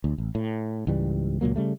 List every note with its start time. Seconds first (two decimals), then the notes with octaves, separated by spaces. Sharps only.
0.04 D2
0.18 A1
0.35 A2
0.87 C#2 G#2 E3 G3
1.41 C#2 A#2 F#3 A#3
1.56 C#3 G3 A3